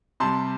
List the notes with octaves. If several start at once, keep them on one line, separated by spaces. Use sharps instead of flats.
C3 G3 A5 C6